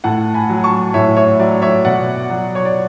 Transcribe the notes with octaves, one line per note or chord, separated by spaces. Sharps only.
A2 F#5 A5
G#5 B5
F#3
A5 C#6
A2 C#5 E5
C#5 E5
F#3 D5
C#5 E5
B2 D5 F#5
F#3
C#5
D5